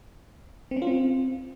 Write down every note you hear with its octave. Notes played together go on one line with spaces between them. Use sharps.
C4
C#4
F4
C4